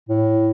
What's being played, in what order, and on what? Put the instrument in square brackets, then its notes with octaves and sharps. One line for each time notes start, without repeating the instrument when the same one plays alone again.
[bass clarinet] A2